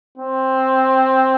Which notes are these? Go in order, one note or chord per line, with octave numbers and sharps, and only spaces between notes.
C4